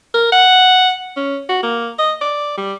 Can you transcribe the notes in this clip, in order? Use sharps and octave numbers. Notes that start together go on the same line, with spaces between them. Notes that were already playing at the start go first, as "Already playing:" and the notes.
A#4
F#5
C#4
F#4
A#3
D#5
D5
G3